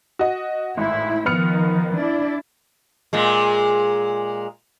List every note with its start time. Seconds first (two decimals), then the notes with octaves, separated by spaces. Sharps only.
0.19 F#4 D#5
0.77 G#1 A2 E4
1.26 D#3 F3 B3 F6 C#7
1.94 D4 E4 D5
3.13 A#2 G#3